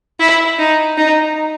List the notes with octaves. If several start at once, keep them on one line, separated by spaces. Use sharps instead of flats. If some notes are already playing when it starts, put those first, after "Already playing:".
E4
D#4
D#4